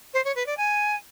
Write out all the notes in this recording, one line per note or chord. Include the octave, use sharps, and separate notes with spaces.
C5
C#5
B4
D5
G#5